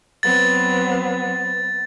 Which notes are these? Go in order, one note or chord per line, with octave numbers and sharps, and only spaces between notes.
F#3 B3 C4 A6